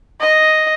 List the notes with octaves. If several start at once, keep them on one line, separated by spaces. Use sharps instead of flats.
D#5